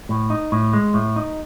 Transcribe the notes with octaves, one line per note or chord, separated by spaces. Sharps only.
A2
D#4
A2
G#3
A2
D#4